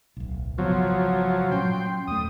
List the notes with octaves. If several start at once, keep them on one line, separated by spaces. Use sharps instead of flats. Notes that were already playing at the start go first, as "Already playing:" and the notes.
D1 B1
G#1 C#3 F3 F#3 B3
A#2 F#3 C#4 G5 C6
E2 A3 D#6